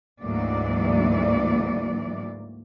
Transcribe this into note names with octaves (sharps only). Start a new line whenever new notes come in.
D2 G#2 E3 F#3 A#3 D5